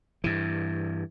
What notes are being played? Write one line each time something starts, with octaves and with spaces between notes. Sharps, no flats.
G2 E3